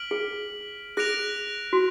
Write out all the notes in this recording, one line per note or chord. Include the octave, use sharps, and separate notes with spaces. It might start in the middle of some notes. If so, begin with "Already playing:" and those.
Already playing: F6 B6 D7 F#7
G#4
G#4 F#6 A#6 D7 F7
F#4